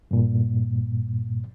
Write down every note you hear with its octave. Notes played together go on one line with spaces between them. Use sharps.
G2 A#2